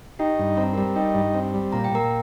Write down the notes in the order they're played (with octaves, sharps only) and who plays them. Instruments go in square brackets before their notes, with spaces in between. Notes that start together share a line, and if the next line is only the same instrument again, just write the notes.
[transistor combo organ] D#4 [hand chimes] G4 G5
[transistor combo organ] G2
[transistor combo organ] C4 [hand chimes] A#5
[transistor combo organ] G3 [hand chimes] A#4 A#5
[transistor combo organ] D#4 [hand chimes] G4 G5
[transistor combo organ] G2
C4
G3
[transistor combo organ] A#2 [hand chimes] A#5
[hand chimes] G5
[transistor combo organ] A#2 [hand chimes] A#4 A#5